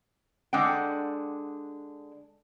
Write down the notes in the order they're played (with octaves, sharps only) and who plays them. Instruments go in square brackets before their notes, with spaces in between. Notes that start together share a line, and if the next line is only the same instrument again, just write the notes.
[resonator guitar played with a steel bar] D3 G#3 D4 F#5 G5